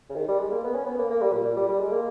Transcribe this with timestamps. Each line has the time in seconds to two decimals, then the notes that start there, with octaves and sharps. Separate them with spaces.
0.09 C#3
0.16 D#3
0.28 G3
0.39 G#3
0.51 A#3
0.64 B3
0.74 C#4
0.86 B3
0.98 A#3
1.10 A#3
1.21 G3
1.33 A#2
1.44 A#2
1.57 G3
1.69 G3
1.80 G#3
1.91 A#3